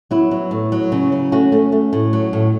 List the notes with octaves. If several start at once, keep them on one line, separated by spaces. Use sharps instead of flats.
F#3 B3 E4
F#3
A2
F#3
C#3
F#3
A3 C#4 F#4
A3
A3
A2
F#3
A2